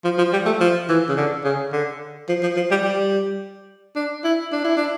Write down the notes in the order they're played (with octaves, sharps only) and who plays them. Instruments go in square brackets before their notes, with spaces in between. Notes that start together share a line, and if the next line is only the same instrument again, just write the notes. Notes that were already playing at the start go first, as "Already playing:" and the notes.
[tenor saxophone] F3
F3
G3
A3
F3
E3
C#3
D3
C#3
D3
F3
F3
F3
G3
G3
D4
E4
D4
E4
D4